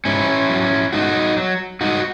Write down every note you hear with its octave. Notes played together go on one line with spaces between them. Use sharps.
G#2 C#4 E4
F#3
G#2 D#4 F#4
F#3
G#2 D#4 F#4